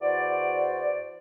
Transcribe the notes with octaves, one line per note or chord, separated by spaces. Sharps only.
E2 F#4 C5 D5